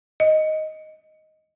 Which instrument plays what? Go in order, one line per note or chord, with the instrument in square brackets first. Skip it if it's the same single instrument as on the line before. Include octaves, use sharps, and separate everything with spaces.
[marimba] D#5